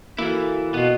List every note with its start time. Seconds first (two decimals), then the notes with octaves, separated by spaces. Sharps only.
0.18 E3 A#3 E4 F#4 A4
0.74 B2 B3 F4